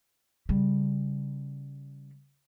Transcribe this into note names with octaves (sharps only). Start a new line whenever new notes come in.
C#3 G3